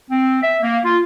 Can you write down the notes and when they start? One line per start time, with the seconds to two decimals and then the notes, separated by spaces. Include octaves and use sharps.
0.11 C4
0.42 E5
0.62 A#3
0.85 F4